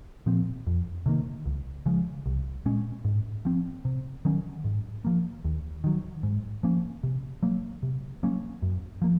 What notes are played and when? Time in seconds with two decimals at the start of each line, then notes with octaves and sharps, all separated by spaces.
0.26 A#2 F3 C4
0.67 F2
1.06 C3 D#3 A#3
1.46 C#2
1.86 C#3 F3 G#3
2.26 C2
2.65 A#2 G#3 C#4
3.05 G#2
3.45 F3 C4
3.85 C3
4.25 D#3 F#3 C#4
4.64 G#2
5.05 F3 A#3
5.44 D#2
5.84 D#3 F#3
6.23 G#2
6.63 F3 A#3 C#4
7.03 C3
7.43 F#3 A#3
7.83 C3
8.23 F#3 A#3 C#4
8.62 F#2
9.02 F3 A#3